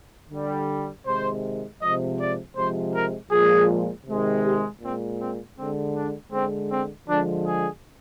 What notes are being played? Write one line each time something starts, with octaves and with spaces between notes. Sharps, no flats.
D3 G3
C3 D#3 G#3 C5
C3 F3 G#3 D#5
D5
C3 F3 G#3 C5
A#4
A#2 F3 G#3 G#4
C3 D#3 G#3
G4
A#2 G#3 C4
C4
D3 G#3 C4
D4
D3 G#3 C4
C4
D3 F3 G#3 D4
G#4